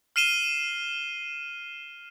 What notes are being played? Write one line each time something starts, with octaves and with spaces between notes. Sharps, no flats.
F6 C7 D#7 E7 G7